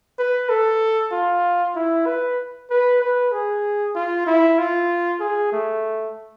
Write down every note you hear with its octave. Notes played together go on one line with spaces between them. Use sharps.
B4
A4
F4
E4
B4
B4
B4
G#4
F4
E4
F4
G#4
A3